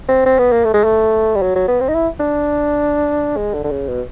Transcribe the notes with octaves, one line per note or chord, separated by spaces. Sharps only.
C4
C4
B3
A#3
A3
G#3
A3
G3
F#3
F#3
B3
C4
D#4
E4
D4
G#3
D3
D3
C#3
B2